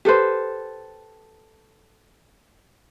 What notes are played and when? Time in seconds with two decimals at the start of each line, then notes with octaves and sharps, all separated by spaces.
0.05 G4 A4 B4 C5